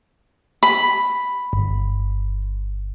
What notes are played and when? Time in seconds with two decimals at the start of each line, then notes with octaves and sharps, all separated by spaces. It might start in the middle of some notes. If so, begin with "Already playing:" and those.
0.63 B5
1.53 G1